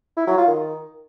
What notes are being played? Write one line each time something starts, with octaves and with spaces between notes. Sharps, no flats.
E4
F#3
F4
D#3